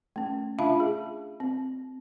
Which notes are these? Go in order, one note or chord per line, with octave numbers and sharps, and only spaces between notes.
A3 C#4
D4 F4 E5 F5 A5 B5
G#4
C4